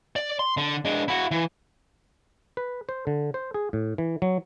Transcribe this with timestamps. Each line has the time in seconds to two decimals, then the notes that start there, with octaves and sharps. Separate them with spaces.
0.16 D5
0.39 C6
0.57 D3
0.85 G#3 D4
1.08 E4 F#4
1.31 E3
2.57 B4
2.89 C5
3.07 D3
3.34 C5
3.54 G#4
3.73 A2
3.98 E3
4.22 F#3